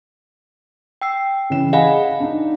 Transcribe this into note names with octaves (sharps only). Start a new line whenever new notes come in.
G5 E6 C7
C#3 E3 E7
G#4 D#5 F5 F#5 G#5 B5
D4 D#4